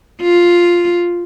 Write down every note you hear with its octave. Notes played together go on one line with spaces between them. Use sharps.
F4